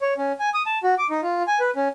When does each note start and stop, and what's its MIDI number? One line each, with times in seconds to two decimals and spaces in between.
0.01 0.14 73
0.18 0.32 61
0.40 0.50 80
0.54 0.62 87
0.66 0.78 81
0.83 0.95 66
0.98 1.07 86
1.10 1.21 63
1.23 1.43 65
1.48 1.59 80
1.60 1.70 71
1.76 1.88 61